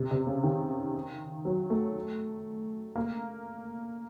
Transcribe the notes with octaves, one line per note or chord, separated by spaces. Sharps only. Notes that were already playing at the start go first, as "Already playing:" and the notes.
Already playing: C3
C3
C#3
D#3
F#3
A3
A#3